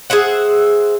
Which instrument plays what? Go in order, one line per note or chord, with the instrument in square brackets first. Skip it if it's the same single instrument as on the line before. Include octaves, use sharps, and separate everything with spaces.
[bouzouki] G#4 C5 E5 F#5